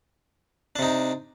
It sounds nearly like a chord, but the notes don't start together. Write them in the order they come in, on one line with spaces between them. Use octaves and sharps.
D4 C3 D#4